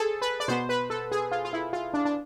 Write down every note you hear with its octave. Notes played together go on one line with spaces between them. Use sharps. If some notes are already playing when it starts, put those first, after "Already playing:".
Already playing: G#4 A4 C5
B4
D5
B2 B3 C5
B4
A4
G#4
F4
F4
E4
F4
D4
D4